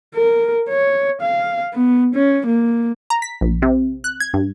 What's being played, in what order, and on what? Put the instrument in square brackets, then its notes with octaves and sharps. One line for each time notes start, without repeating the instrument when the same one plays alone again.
[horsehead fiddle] A#4
C#5
F5
B3
C#4
A#3
[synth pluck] A#5
B6
A#1
C3
F#6
G#6
G2